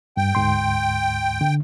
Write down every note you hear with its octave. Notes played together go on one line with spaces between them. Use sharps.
G2 G5
D2 G#2 C6
D3